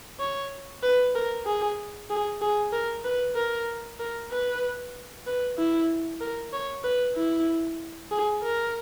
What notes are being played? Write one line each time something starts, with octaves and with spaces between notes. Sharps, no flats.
C#5
B4
A#4
G#4
G#4
G#4
A#4
B4
A#4
A#4
B4
B4
E4
A#4
C#5
B4
E4
G#4
A#4